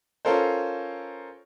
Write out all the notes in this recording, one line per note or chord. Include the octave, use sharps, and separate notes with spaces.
C#4 F4 A4 A#4 C5